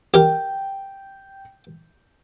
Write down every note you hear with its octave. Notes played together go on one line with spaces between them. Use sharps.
G4 A#4 G5